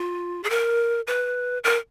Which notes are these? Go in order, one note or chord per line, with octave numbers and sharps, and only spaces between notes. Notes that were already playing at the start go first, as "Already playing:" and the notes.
Already playing: F4
G#4
A#4
B4
A#4